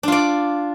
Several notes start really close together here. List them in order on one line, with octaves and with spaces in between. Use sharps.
D4 F4 D5